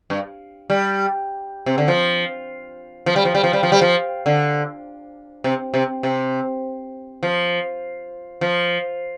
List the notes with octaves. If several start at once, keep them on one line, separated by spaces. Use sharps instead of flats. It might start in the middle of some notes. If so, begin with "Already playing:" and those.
G2
G3
C3
D3
F3
F3
G3
F3
G3
F3
G3
F3
G3
F3
D3
C3
C3
C3
F3
F3